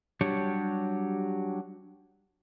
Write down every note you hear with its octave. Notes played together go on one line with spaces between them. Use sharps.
F#3 G3 D4 G4 C#5